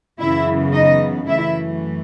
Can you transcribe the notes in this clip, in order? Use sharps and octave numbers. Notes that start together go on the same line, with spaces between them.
F#2 C#3 E3 B3 E4 E5
D#4 D#5
F#2 E3 A3 E4 E5